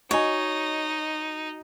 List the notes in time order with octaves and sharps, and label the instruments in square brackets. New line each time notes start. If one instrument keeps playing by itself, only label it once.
[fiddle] D#4 [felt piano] F#4 D#5 G#5 [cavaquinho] C#5